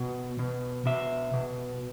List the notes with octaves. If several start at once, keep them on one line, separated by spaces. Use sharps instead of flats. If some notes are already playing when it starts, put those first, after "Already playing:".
Already playing: B2
B2
B2 E5
B2